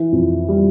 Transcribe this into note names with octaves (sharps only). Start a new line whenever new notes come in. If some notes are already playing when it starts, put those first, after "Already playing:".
Already playing: E3
F2
G3